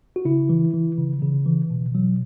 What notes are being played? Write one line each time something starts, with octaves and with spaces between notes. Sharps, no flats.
F#4
C#3 E4
E3
E3
C#3
C#3
E3
B2
F#3